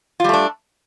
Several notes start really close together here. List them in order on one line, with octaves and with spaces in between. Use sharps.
F4 G3 A3 D4